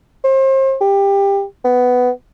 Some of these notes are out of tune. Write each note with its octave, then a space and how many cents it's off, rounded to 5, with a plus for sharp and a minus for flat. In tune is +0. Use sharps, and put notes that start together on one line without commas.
C5 +35
G4 +20
B3 +10